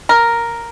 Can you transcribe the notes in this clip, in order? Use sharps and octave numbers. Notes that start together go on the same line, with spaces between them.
A#4